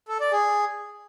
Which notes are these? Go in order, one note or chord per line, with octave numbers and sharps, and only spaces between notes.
A4
D5
G#4